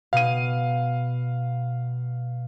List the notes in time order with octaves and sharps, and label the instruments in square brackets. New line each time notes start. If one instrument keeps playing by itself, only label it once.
[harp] B2 [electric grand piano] F5 D#7